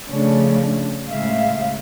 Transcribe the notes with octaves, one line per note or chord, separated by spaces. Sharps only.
C#3 F3 A3 C#4 D4
A2 C#3 G#3 E5 F5